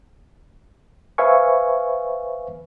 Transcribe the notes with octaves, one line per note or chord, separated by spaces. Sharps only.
B4 C5 E5 F5 G#5 C#6